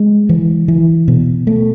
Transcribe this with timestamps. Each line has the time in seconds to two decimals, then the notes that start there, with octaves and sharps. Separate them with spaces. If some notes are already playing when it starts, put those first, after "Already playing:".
Already playing: G#3
0.29 E3
0.68 E3
1.08 B2
1.47 A3